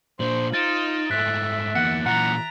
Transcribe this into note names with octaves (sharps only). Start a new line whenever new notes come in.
A#2 D4 C5 F#7
D#4 F4 A6 D7 E7
G#2 A3 E5 F#6 B6
E2 A#3 F#5
A#2 E3 F#5 A#5